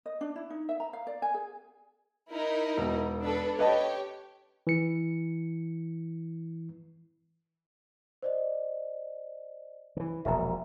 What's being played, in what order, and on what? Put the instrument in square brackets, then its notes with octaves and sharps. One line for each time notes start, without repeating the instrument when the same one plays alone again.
[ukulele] D#5
D4
E4
D#4
E5
A#5
F5
D5
G#5
G#4
[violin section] D#4 E4 A#4
[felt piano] E1
[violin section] D4 A4 B4
[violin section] G4 C#5 [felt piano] B4 D#5 A5
[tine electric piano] E3 C#7
[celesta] C5 D5 D#5
[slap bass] D#3 E3
[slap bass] E1 A#1 [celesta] E5 A#5